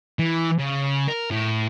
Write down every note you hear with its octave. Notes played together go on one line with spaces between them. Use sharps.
E3
C#3
A#4
A2